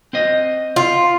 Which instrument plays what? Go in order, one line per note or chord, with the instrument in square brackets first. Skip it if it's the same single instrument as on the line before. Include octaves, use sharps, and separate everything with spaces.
[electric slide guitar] C4 C5 D#5
[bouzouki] F4